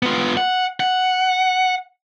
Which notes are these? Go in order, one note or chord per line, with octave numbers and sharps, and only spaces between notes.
B3 F4
F#5
F#5